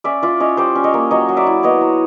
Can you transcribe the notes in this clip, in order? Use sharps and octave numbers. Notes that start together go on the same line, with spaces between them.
C#4 D5 E5
F4 D5 E5
C#4 C#5 D#5
G3 C5 D5
C#4
C#5 D#5
A#3
F#3 C#5 D#5
F#3
D5 E5
E4
B3 C#5 D#5
F#3